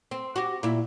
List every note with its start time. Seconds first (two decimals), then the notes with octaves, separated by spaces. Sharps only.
0.11 C4
0.36 F#4 G4
0.63 A#2 E4